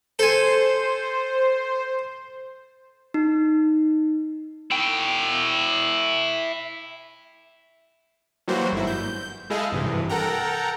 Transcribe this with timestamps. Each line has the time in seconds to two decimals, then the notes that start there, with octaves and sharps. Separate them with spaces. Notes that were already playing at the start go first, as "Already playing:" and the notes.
0.19 A4 C5 G#5
3.14 D#4
4.71 E4 G5
8.48 E3 F#3 G3 A#3 F#4 C5
8.72 G1 G#2 E4
8.87 G6
9.50 G#3 E4 G#4 A4 D#5 F5
9.72 G#1 G2 C3 E3
10.09 A4 A#4 F#5 G5 A#5